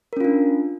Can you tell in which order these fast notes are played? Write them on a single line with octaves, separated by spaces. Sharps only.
A#4 C#4 F4 D4